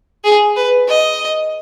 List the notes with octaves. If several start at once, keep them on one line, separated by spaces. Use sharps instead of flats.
G#4
B4
D#5